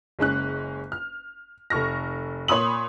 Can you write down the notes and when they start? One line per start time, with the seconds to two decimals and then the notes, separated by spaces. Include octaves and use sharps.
0.19 F#1 G#3 C#4 F#6
0.92 F6
1.70 F1 A4 C#6 F6 A#6
2.48 A#2 C#5 B5 C6 D#6 F#7